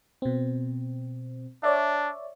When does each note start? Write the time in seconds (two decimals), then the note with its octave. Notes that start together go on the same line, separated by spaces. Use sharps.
0.22 B2 C4
1.63 D4 C#5 D5 E5